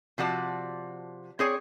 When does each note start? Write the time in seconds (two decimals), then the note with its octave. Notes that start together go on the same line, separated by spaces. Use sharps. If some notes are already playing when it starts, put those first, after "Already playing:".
0.18 C3 F3 F#4 D5 A5
1.39 C4 G#4 C#5 D5